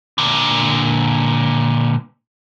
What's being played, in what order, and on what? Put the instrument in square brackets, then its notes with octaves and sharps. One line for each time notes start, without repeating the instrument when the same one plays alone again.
[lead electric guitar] A#2 D3